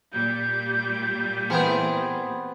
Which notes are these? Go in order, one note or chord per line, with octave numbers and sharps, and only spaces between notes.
A#2 G3 G6
E3 B3 C4 G#4 A#4